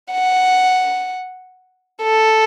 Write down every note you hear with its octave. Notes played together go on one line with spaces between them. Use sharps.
F#5
A4